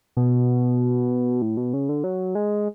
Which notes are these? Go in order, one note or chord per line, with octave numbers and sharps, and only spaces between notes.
B2
A2
B2
C#3
D3
F#3
G#3